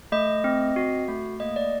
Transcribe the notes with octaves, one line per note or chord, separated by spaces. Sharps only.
A3 D#5
C4
F#4
A3
A#3 D#5
D5